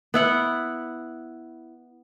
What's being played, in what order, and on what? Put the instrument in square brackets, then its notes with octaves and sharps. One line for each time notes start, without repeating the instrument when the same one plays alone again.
[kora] B3 E4 F#5